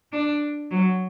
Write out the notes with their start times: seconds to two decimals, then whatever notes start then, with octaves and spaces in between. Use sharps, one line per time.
0.13 D4
0.71 F#3